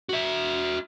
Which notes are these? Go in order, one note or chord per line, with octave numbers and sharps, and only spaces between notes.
F#4 E5